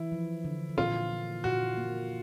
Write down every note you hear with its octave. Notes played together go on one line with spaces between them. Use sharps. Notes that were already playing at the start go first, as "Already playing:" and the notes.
Already playing: E3 E4
F3
D3
A#2 F4
A#3
A#2 F#4
A#3